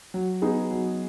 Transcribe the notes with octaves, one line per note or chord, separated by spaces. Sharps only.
F#3
B3 D#4 G#4
F#3